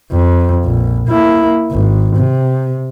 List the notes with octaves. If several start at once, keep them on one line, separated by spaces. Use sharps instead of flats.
F2
A#1
A#3 E4
G#1
C3